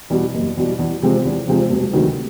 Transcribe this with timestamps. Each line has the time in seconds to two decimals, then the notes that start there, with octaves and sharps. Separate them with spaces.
0.10 E2 B2 G3
0.34 F#1
0.57 E2 B2 G3
0.79 E2
1.02 C3 F3 G#3 C4
1.25 E2
1.48 C3 F3 G#3 C4
1.70 E1
1.93 D2 C3 D#3 F#3